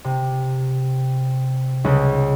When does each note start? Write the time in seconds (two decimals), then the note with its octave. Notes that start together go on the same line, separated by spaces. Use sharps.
0.04 C3
1.84 C#2 C#3